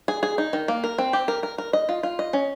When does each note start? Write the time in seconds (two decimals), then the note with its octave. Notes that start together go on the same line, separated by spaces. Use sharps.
0.08 G#4
0.23 G#4
0.38 D#4
0.53 D#3
0.68 A#3
0.84 A#4
0.98 C4
1.13 G4
1.28 A#4
1.43 A#4
1.58 A#4
1.73 D#5
1.89 F4
2.03 F4
2.19 D#5
2.33 C#4